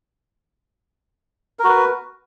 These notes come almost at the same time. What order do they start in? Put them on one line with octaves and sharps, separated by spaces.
A#4 F#4 B4